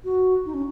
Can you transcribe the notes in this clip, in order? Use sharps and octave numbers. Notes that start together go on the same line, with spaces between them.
F#4
D#4
C#4